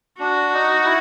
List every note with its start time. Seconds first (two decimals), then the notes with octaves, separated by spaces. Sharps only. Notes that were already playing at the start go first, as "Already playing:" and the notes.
0.20 D4 F#4
0.53 D#4
0.85 E4